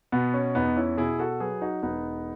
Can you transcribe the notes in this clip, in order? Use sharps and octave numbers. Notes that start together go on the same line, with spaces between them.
B2 B3
C#4
E2 B3 D#4
C#4 E4
B2 E4 G#4
F#4 A4
F#3 G#4 B4
D#4 F#4
E1 B3 D#4